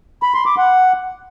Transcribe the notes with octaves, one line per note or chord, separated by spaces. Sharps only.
B5
C6
D6
F#5